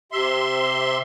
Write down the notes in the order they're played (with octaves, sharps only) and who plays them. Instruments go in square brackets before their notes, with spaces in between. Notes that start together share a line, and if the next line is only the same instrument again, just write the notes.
[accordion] C3 E5 C6